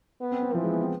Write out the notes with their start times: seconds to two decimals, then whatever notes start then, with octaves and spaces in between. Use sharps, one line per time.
0.20 B3
0.32 C4
0.43 C4
0.54 E3 F3
0.64 G#3
0.73 B3
0.82 C4